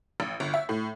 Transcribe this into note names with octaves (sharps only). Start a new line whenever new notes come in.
A1
G1
E5
A2